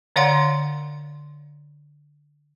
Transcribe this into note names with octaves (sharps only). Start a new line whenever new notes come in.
D3 C#5 D5 F5 F#5 C6